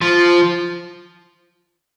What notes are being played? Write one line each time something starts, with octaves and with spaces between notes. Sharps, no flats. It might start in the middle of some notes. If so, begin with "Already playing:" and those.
F3